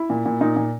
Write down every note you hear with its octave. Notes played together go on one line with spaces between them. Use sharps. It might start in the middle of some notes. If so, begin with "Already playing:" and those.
Already playing: E4
A#2
A#2
A#2 D#4
A#2